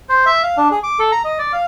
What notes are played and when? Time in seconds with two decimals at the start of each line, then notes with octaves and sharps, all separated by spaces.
0.09 C5
0.26 E5
0.43 F5
0.57 D4
0.71 G#4
0.83 D6
0.99 A4
1.12 A#5
1.24 D#5
1.39 D5
1.53 F5